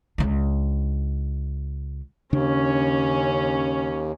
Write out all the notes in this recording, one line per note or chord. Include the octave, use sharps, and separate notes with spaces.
C#2 D4
D#2 C#3 C#4 D4